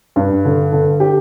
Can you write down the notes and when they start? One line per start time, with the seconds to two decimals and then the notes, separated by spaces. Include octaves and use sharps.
0.16 G2
0.45 D3
0.72 D3
1.00 G4